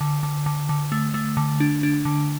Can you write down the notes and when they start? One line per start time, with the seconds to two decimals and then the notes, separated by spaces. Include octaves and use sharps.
0.01 D3
0.23 D3
0.46 D3
0.69 D3
0.92 A3
1.14 A3
1.37 D3
1.60 D4
1.83 D4
2.05 D3